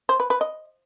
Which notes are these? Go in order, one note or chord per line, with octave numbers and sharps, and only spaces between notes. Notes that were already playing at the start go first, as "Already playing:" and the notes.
C5
B4
B4
D#5